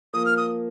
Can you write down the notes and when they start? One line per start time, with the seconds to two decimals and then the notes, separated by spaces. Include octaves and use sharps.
0.14 F3 A#3 D#6
0.26 F6
0.37 D#6